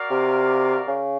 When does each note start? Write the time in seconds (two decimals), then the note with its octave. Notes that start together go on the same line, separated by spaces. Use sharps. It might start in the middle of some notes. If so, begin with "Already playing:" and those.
Already playing: F#4 A#4 D5 F5
0.10 C3
0.87 C#3